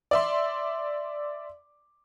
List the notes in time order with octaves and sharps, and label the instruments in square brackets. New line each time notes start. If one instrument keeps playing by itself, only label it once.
[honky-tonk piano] D5 E5 C6